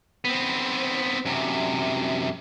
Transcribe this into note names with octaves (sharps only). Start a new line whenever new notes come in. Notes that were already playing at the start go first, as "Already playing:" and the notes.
B3 C4
F#2 C3